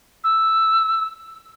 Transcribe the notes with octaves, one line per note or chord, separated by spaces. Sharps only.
E6